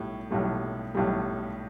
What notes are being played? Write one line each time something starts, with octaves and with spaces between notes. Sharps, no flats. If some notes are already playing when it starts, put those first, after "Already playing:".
Already playing: B1 A2 G3
B1 A2 G3
B1 A2 G3